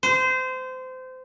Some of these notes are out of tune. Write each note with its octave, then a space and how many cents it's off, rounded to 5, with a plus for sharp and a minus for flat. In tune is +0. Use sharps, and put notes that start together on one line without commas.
C5 -25